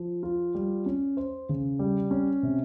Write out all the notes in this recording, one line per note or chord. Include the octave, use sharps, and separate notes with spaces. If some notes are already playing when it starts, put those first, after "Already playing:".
Already playing: F3
F4
G3
C#4
C5
C#3
G3
C#4
C3